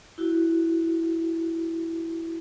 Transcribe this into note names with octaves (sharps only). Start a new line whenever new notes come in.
E4 F#4